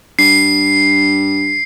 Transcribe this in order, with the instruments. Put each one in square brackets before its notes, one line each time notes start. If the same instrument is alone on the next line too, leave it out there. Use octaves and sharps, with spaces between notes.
[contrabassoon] G2 [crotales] C7